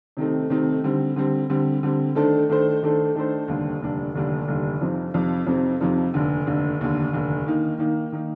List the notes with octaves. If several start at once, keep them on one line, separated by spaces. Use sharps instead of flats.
C3 D#3 A3 C4 D#4
C3 D#3 A3 C4 D#4
D3 G3 C4
D3 G3 C4
D3 G3 C4
D3 G3 C4
D#3 A3 D4 A4 C5
D#3 A3 D4 A4 C5
D#3 A3 D4 A4 C5
D#3 A3 D4 A4 C5
F1 D#2 D3 G3 D4
F1 D#2 D3 G3 D4
F1 D#2 D3 G3 D4
F1 D#2 D3 G3 D4
F2 C3 F3 C4 D#4
F2 C3 F3 C4 D#4
F2 C3 F3 C4 D#4
F2 C3 F3 C4 D#4
F1 D#2 D3
F1 D#2 D3
F1 D#2 D3
F1 D#2 D3
D#3 A#3 D#4
D#3 A#3 D#4
D#3 A#3 D#4